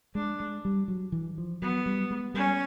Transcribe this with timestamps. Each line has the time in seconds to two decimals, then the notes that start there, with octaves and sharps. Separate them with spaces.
0.15 G#3 D4
0.40 G#3
0.65 G3
0.88 F#3
1.12 E3
1.38 F3
1.62 F#3 B3
1.86 G3
2.10 G#3
2.34 G3 C#4